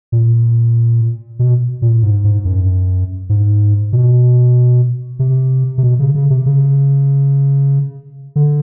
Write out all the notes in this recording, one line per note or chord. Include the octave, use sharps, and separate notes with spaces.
A#2
B2
A#2
G#2
G#2
F#2
G#2
B2
C3
C3
B2
C#3
C#3
C3
C#3
D3